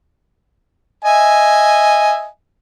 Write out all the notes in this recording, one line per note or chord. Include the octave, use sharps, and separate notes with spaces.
D#5 E5 G#5